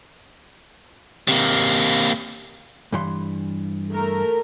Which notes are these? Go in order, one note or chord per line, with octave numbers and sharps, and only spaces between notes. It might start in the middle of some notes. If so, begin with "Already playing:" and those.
C3 A#3
G2 E3 C6
A3 A#4